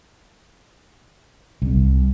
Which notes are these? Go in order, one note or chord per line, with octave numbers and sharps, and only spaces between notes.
C2